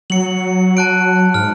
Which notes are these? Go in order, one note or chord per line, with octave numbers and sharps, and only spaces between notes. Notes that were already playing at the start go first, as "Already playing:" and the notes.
F#3 C#7 F#7
A5 F#6 D7
G#2 F6